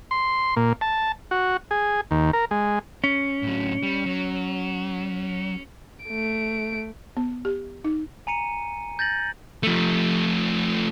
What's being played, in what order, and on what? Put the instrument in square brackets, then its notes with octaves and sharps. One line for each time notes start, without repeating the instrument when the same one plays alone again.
[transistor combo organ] C6
A#2
A5
F#4
G#4
D#2
A#4
G#3
[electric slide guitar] C#4
[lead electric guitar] A2 F#3
G3
F#3
[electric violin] A3 D7
[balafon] B3
G4
D#4
[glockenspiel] G#5 A#5 C#7 D#7
G6 A6 A#6 F#7
[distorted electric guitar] F3 A3